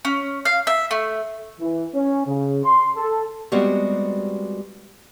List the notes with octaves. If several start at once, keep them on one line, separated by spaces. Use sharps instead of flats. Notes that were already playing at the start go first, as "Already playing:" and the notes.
C#4
F5
E5
A3
E3
C#4
C#3
C6
A4
G3 G#3 B3 C4 F#4 G4